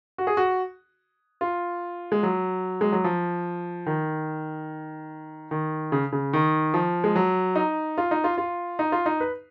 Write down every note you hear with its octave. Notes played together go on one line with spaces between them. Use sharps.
F#4
G#4
F#4
F4
G#3
F#3
G#3
F#3
F3
D#3
D#3
C#3
C#3
D#3
F3
G#3
F#3
D#4
F4
D#4
F4
F4
D#4
F4
D#4
B4